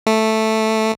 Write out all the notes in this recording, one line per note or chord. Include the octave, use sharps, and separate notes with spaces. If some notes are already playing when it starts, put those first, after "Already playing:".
A3